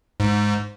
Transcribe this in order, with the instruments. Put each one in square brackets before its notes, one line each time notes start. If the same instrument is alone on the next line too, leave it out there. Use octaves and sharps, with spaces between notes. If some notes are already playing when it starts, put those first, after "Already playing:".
[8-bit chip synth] G#2